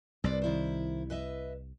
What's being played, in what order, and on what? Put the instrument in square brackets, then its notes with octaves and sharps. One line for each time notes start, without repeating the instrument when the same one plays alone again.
[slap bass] C2 [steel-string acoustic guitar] B4 C5 D5
[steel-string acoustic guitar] D#3 E4 C5
B4 D#5 E5